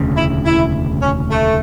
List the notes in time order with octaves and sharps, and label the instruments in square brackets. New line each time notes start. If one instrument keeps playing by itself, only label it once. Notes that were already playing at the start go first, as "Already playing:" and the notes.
Already playing: [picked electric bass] E1 D2 C#3
[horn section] E4
E4
C#4
A3